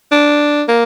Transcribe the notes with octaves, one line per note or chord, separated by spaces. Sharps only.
D4
A#3